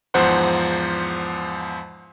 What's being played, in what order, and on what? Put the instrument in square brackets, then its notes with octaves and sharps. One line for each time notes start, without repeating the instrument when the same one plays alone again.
[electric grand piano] E2 G#2 F3 C5 F#5 C6